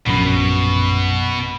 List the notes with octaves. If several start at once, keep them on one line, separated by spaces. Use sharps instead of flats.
A#1 F#2 B2 B5